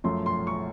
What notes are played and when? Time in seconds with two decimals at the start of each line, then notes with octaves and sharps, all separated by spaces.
0.04 F#2 F3 A3 C6
0.26 C6
0.47 C#6